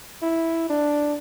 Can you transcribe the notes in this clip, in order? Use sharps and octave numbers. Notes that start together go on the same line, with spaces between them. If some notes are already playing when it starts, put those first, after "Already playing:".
E4
D4